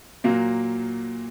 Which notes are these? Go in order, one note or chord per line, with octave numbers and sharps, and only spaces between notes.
A#2 F#3 A#3